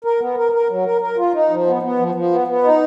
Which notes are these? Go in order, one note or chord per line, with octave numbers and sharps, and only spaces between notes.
A#4
B3
A#4
A#4
F#3
A#4
A#4
F4
D#4
F3
B3
B3
F3
F3
B3
B3
D#4